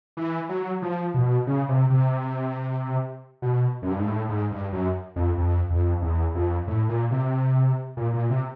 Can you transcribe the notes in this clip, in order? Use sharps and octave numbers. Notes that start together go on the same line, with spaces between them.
E3
F#3
F3
B2
C#3
C3
C3
B2
F#2
G2
G#2
A2
G#2
G2
F#2
F2
F2
F2
E2
F2
A2
A#2
C3
A#2
A#2
C3